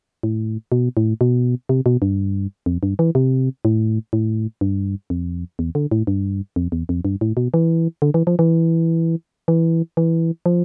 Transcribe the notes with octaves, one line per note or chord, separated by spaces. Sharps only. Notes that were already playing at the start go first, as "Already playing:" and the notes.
A2
B2
A2
B2
C3
B2
G2
F2
G2
E3
C3
A2
A2
G2
F2
E2
D3
A2
G2
F2
E2
F2
G2
A2
B2
E3
D3
E3
F3
E3
E3
E3
F3